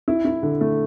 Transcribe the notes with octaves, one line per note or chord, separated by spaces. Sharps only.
E4
E4
D3
A3